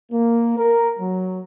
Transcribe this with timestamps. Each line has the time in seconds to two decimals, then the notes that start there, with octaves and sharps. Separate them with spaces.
0.11 A#3
0.57 A#4
0.99 F#3